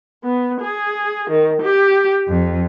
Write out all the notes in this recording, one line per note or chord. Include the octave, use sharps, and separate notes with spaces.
B3
G#4
D#3
G4
F2